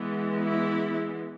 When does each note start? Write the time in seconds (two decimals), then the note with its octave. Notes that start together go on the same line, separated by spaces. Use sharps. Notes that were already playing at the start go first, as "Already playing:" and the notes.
Already playing: E3 G#3 B3
0.41 E4